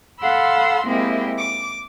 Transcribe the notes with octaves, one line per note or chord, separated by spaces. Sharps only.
A4 F5 F#5 B5 C6 E6
G#3 A#3 C4 E4 G4 G#4
D6